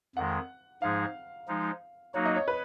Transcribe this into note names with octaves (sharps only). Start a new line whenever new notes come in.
F2 D#3 G#3 F#5
G#2 F3 G#3 D#4 G#4 F5
F3 G#3 D#4
F#3 A#3 D#4 F#4 C#5
D#5
C#5
B4